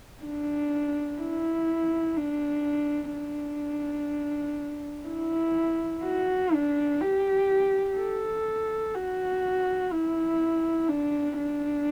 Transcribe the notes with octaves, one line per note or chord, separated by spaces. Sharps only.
D4
E4
D4
D4
E4
F#4
D4
G4
A4
F#4
E4
D4
D4